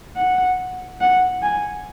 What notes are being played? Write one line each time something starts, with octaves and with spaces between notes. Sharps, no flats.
F#5
F#5
G#5